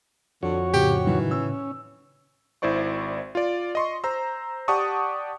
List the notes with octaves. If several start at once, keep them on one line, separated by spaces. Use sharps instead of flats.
F2 D3 F#4 C#5
A2 C#3 G4
D#3 E3 F#3
C#4 E6
G#1 E4 C5 D5 C#6
F4 D5
D#5 C6 C#6
C5 A#5 E6
G4 D5 F#5 A5 C#6 D#6